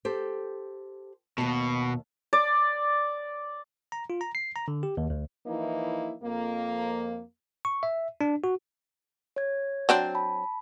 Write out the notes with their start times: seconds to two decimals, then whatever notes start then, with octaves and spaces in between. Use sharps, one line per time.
0.05 G4 A4 C5
1.38 D#2 B2 A5
2.33 D5
3.92 A#5
4.10 F4
4.21 A#5
4.35 C7
4.56 A#5
4.68 D3
4.83 G4
4.97 D#2
5.10 D2
5.46 E3 F3 A#3 D#4 E4
6.23 F2 A#3
7.65 C#6
7.83 E5
8.21 D4
8.44 F#4
9.36 C#5 G#6
9.89 F#3 C4 D4
10.15 A5 B5